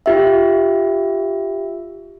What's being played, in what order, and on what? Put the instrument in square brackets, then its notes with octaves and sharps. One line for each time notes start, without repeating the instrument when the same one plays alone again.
[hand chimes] F4 G4 E5